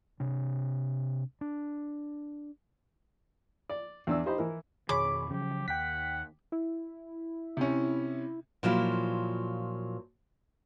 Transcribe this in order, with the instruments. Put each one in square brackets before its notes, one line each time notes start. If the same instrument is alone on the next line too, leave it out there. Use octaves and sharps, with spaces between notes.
[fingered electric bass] C3 D4
D4
[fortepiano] D5
E2 D4 E6
D#4 G4 C5 D#5 B5
E3 E4 A#4
[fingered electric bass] F2 B2 D#3 [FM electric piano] G#4 C#5 B5 [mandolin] D6
[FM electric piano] C#3 [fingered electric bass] F3 F#3 [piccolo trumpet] G4
[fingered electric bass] D#2 [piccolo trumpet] F#5 [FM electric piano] G5 B6
[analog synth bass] E4
[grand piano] C3 C#4
[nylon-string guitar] A#2 F3 F#3 E4 F4